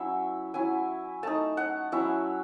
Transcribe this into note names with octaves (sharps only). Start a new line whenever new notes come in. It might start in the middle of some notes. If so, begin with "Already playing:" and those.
Already playing: F#3 C#4 E4 E5
F#3 C#4 E4 G#5
A3 D#4 A5
F#5
F#3 C#4 E4 E5